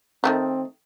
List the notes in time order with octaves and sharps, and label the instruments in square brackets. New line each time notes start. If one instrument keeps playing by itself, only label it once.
[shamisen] D#3 G#3 A3 [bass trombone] C4